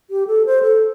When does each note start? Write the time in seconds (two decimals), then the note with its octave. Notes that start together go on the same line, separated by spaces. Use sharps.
0.10 G4
0.27 A4
0.46 C5
0.63 A4